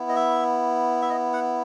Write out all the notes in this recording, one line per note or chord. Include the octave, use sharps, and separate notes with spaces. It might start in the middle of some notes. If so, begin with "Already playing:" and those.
Already playing: B3 E4
D#5
E5
E5
D#5
F#5